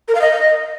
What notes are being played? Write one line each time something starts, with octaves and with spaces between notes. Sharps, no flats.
A#4
F5
D#5